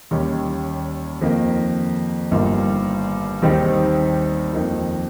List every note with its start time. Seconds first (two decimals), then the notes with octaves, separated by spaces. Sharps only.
0.11 D#2 D#3 G3 C#4
1.21 F2 D#3 A#3
2.31 G1 G2 D#3 A#3 F4
3.42 D#2 D#3 G3 C4 D#4
4.53 F2 D#3 A#3 D#4